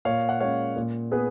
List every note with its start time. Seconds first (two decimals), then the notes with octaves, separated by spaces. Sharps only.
0.05 A#2 C#5 F5
0.29 F#5
0.40 G#3 C#4 C#5 F5
0.76 A#2
1.11 B3 G#4 B4